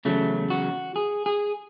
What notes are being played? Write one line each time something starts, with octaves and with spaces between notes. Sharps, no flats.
E2 C#3 F#3 A3
F#4
G#4
G#4